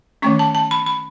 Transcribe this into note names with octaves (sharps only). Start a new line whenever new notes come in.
D#3 A3 C#4 C#6
A5
A5
B5
B5